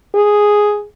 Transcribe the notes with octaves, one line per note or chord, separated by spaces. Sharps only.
G#4